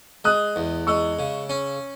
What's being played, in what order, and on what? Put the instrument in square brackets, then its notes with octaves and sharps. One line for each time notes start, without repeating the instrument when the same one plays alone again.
[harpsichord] G#3 [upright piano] D#6 F#6
[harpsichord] E2
[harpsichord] G#3 [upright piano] C#6 E6
[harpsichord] C#3
C#4